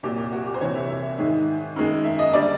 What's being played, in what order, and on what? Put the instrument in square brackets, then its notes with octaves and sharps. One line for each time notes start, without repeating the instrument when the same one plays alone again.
[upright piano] C2 A#2 F#3 G4
G4
F#4
G4
C5
C2 C3 E3 C#5
E5
E5
G#2 D#3 G#3
F#2 D#3 G#3
E5
D#5
D3 G3 D5